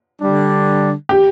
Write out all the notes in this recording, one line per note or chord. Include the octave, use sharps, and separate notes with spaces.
D3 G3 D4
G4